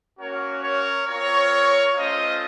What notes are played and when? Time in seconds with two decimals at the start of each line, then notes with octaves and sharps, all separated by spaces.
0.18 A#3 C#4 F#4 A#4 C#5
0.62 A#4 C#5
1.07 C4 F4 A#4 C#5
1.95 A3 C#4 F4 C5 D#5